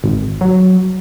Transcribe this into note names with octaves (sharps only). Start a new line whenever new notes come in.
G#1
F#3